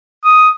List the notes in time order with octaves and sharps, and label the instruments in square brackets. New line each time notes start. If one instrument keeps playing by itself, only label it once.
[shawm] D#6